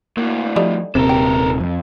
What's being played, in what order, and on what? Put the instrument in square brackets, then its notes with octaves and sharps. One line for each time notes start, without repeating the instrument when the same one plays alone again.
[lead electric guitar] D2 A2 [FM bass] A#3
[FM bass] F3 [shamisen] G3 A3 D#4
[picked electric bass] D#1 C3 [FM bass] C4 [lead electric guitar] A4 A#4
[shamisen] G4
[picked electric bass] F2